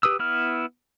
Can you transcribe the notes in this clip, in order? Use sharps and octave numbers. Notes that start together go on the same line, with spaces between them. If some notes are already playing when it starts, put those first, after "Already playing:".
G4 B4 D#6 E6
B3 E4 F6